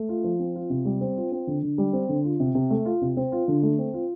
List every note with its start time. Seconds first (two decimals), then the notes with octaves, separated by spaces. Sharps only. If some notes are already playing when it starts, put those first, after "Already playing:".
Already playing: A3
0.09 F4
0.24 F3
0.39 C4
0.55 F4
0.70 C3
0.85 G3
1.01 C4
1.17 F4
1.32 C4
1.47 D3
1.63 D3
1.78 G3
1.93 C4
2.09 D3
2.24 F4
2.40 C3
2.55 C3
2.70 A3
2.85 F4
3.02 C3
3.17 C4
3.32 F4
3.48 D3
3.63 A3
3.78 C4
3.94 F4